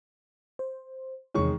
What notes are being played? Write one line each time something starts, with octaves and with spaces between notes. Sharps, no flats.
C5
E2 C3 D#3 G#3 C#5 C#6